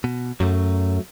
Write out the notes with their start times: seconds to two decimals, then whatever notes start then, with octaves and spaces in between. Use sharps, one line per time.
0.04 B2
0.40 F#2 F#3 A3